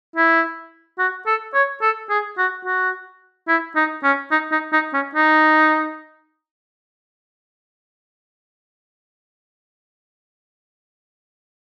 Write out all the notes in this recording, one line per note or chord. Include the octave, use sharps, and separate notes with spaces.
E4
F#4
A4
C#5
A4
G#4
F#4
F#4
E4
D#4
C#4
D#4
D#4
D#4
C#4
D#4